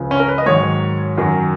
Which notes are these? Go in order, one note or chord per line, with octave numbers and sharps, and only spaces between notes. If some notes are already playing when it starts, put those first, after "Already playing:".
Already playing: C#2 C#3 F3
C#4
A#4
B4
D#5
G#2 D#3 F#3 C#5
F#2 D#3 F#3